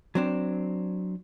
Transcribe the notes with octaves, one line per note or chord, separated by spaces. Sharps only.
F#3 C4 D4